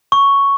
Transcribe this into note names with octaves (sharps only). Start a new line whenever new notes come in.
C#6